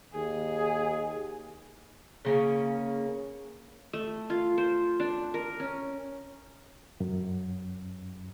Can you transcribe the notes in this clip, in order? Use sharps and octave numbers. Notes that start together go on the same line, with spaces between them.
D#2 G#4
C#3 A#3 C#4
A3
F4
C5
D4
A#4
C#4
F#2